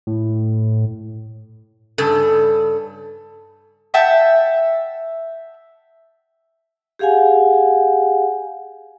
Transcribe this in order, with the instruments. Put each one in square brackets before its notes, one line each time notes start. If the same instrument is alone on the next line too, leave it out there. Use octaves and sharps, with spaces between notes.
[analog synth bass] A2
[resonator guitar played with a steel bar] G2 C#3 A4
[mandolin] E5 F#5 G5 A5
[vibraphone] G4 G#4 F5 F#5 G#5